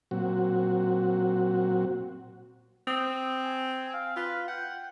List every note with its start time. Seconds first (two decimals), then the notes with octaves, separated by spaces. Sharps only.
0.11 A#2 F#3 C4 F#4
2.87 C4 D#6
3.44 G#5
3.93 F5
4.16 F4 B4
4.48 F#5 G5